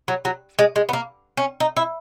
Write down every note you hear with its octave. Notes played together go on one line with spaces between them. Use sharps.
F#3
F#3
G#3
G#3
B3
A#3
C#4
D#4
E4